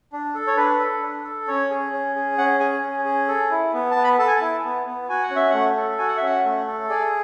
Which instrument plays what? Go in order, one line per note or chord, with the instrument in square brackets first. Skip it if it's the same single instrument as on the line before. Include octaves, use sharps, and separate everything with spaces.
[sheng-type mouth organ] D4
A4
C#5
D4 B4
A4
D4
A4
C#4 C#5
G#4
C#4
G#4
C#4 F#5
G#4 G#5
C#4
G#4
A4
E4
B3
B3 A5
B5
A4 A5
G#5
A5
E4
B3
B3
F#4 G#5
F#5
C#4
E5
A3 F#5
A4
F#4 G#5
F#5
E5
C#4 F#5
A3
A4
G#4 D5